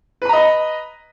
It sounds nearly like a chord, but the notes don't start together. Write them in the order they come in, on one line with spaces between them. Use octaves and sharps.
B4 B5 A#5 D#5